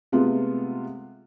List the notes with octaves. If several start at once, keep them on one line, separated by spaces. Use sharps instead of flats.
C3 G#3 A3 B3 F4